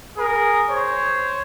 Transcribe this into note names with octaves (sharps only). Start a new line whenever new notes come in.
G#4 A#4
C5 C#5